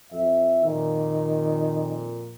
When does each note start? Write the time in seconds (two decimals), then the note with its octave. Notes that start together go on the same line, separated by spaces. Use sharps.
0.12 F2 E5
0.64 F2 A#2 D#3